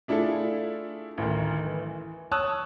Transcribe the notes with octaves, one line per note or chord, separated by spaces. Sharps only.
A3 D4 E4 F4 G#4 A4
A1 D2 D#3
E3
C#5 A5 C#6 D#6 E6 F#6